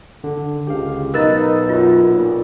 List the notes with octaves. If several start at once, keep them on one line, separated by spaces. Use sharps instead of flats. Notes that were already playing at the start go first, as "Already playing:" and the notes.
D3
C#2 G4 F5
B1 D#4 A#4 B4 E6 A6
F#2 F4
B1 A#2